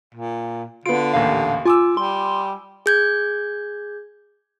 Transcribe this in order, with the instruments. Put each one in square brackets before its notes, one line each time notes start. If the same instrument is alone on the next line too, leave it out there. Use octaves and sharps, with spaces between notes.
[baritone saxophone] A#2
[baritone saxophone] D3 [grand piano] B3 F4 [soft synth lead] D7
[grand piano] A1 D#2 A#2 [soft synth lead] F5
[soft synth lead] F4 [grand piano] G#5 D6 E6
[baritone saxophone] G3 [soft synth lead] C6
[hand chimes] G#4 G6 G#6